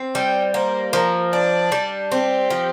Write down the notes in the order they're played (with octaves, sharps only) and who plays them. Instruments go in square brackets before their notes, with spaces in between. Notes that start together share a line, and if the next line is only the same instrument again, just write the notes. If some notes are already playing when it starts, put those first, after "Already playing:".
Already playing: [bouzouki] C4
[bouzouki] G3 [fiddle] G5
[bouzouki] A#3 [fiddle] C5
[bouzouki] F3 [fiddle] A#4
[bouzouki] D4 [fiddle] D5
[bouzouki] G3
[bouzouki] C4 [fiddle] G4
[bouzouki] F3